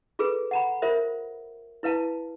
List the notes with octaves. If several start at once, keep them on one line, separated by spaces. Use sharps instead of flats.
F4 G#4 A4 B4
F#5 A#5 B5
F4 A#4 C5 E5
E4 B4 F5 A5